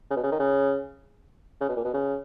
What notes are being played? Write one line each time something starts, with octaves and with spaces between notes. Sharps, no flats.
C#3
B2
C#3
D#3
C#3
C#3
B2
A#2
B2
C#3